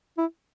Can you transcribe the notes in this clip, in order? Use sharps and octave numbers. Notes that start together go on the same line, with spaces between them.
E4